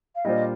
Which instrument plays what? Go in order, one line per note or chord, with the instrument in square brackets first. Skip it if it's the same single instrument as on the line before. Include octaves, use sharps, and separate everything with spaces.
[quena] F5
[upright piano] A#2 G3 D4 F4 C5 [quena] D#5